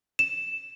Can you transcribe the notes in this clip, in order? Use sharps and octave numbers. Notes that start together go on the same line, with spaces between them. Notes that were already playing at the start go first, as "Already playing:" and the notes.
E7